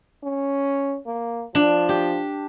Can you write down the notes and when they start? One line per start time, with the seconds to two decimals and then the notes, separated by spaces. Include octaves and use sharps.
0.24 C#4
1.07 A#3
1.55 F3 D4
1.89 G4